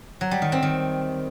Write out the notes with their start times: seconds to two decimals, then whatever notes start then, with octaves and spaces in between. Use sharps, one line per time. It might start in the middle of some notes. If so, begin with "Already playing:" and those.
0.21 F#3
0.31 G3
0.42 D#3
0.52 C4
0.62 D#3